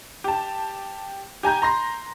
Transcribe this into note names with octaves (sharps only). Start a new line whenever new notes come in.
G4 A5
G4 G#5 A#5 G6
A#5 C6 A#6